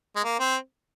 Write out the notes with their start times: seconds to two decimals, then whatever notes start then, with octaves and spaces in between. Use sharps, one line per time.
0.16 G#3
0.24 A#3
0.39 C4